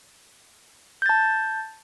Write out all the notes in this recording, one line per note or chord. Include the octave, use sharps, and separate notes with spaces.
A5 G6 A6